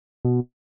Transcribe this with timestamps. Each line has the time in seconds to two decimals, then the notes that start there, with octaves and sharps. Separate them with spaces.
0.25 B2